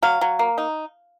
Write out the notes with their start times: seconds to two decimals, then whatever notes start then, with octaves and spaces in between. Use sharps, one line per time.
0.02 F#3 F5
0.21 F#3
0.39 A#3
0.58 D#4